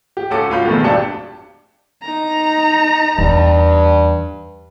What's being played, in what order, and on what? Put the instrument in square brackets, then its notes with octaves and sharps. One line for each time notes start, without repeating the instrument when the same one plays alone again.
[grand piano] G4
C#2 C#4 F#4 A4 D6
C#2 C#4 F4 F5 B5 G6
F2 B2 D#3 G#3 A3
D#1 G#1 D4 G4 A5 C#7
[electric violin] D#4 A#5
[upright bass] E2 [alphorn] G2